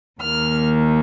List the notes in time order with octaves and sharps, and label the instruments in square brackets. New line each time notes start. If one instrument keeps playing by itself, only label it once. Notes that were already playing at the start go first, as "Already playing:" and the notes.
[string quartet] D#2 D#3 A#3 F6